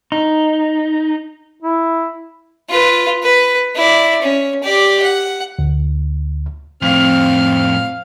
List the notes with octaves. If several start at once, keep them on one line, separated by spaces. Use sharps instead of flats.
D#4
E4
F4 B4
B4
E4 D5
C#4
G4 D5
F#5
D2
F2 A2 C4 F5 F6